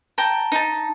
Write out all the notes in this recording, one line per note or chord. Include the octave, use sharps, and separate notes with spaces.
G5 A5 A#5
D#4 A5